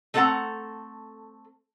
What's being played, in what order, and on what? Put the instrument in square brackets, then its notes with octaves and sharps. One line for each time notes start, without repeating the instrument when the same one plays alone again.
[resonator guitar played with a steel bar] A3 C4 A4 C5 F#5 A#5